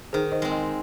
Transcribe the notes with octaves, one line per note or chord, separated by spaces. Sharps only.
D#3 G#4 C5
C5 D#5
G#3 C4
D#5 G5